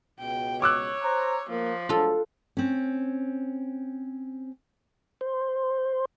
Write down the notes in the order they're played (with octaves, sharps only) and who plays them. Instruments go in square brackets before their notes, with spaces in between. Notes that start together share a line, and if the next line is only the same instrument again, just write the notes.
[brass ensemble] C#2 B2 [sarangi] G5
[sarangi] C#5 [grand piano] D6 E6 F#6
[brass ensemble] C5 A#5
[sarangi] F3 [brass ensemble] A#3
[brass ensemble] D2 F#3 G#3 [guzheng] F4 A4
[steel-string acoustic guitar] C4 C#4
[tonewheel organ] C5